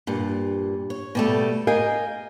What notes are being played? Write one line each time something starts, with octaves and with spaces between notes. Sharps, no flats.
G2 A#2
C#5
B2 G3 A3
A#4 D#5 F5 G5 G#5